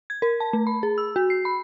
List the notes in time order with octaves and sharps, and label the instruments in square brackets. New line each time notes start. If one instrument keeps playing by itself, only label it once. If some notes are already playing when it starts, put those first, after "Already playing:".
[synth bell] G#6
A#4
A5
A3
B5
G#4
E6
F#4
C7
B5